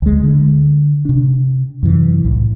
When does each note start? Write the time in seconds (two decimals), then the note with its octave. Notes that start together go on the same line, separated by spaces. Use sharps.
0.02 D2 G#3
0.23 D3
1.05 C3 D4
1.83 F#2 C3 E3
2.25 C2 A2